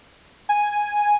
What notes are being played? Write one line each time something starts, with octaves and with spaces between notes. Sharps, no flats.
G#5